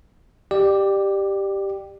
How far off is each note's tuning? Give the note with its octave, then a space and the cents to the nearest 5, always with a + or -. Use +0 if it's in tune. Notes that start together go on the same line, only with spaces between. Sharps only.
G4 +0 D5 +25